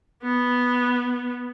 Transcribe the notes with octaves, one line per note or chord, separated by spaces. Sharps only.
B3